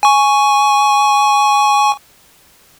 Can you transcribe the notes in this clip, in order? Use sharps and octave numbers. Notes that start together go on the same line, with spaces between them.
G#5 C#6